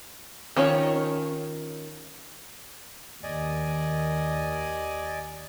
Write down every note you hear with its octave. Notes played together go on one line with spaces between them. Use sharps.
D#3 C#4 F4 C#5
D#2 D5 D#5 G#5